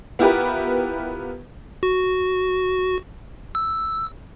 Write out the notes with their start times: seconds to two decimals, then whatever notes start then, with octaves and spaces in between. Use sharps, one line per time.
0.19 B3 E4 F4 G4 A#4 B4
1.83 F#4
3.55 E6